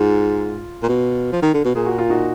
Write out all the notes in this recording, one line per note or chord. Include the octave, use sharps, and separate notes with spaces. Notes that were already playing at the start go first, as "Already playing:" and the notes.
Already playing: G#2 F4
A#2
B2
F3
D#3
D3
B2
A#2 G#4
F#4
F4
D#4 F#4